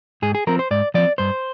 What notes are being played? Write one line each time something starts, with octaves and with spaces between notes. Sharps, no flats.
G#2 G#4
G#4
F3 C4 A#4
C5
G#2 D5
F3 C4 D5
G2 C5